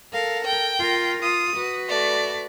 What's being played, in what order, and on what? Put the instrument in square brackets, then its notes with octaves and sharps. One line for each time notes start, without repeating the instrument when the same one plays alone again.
[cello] A4 A#4 [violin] F5
[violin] G5
[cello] F4 A#4
[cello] F4 [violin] D#6
[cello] F#4 B4
[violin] A3 D5